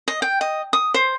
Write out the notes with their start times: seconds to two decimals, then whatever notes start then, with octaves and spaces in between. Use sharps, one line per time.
0.08 D#5
0.22 G5
0.41 D#5
0.73 D#6
0.94 C5